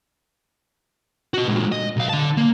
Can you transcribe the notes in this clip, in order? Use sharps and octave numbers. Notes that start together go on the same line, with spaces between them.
F#4 D#5
A#2 G#3
D#5
B1 F5
D3 A5
A#3